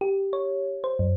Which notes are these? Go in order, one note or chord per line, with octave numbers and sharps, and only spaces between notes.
G4
C#5
C5
F#2